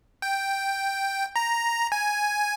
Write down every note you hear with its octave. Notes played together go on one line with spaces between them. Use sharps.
G5
A#5
G#5